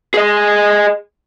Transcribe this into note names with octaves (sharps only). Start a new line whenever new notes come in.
G#4 D#5